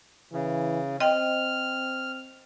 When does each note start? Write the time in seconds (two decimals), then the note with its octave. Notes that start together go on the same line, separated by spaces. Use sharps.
0.33 C#3 E3
1.00 C4 D#5 G5 F6